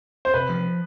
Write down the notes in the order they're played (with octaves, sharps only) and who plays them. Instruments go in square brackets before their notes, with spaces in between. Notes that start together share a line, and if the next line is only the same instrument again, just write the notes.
[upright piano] C5
[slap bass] C3 [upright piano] B4
[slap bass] F3